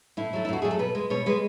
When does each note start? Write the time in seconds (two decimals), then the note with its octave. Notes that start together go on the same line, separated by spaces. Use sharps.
0.17 A2 E4
0.33 F#3 A3
0.45 E4
0.49 A2 F#4
0.62 F#3 A3 G#4
0.71 A4
0.79 B2 B4
0.95 G#3
1.10 B2 C#5
1.26 G#3 B4